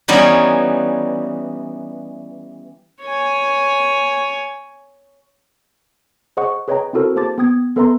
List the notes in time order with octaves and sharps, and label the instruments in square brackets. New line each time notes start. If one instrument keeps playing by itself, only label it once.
[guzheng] E3 G3 B3 C#4 D#4
[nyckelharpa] C#5 G#5
[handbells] G#4 C5 D#5 F#5 C#6
G#4 B4 C#5 D#5 G5 A#5
C4 E4 F#4 A4 A#4 C5
A#3 G#4 C5 A5 D6 A6
B3 G5 D#6 G#6
B3 A4 B4 E5 A#5 C6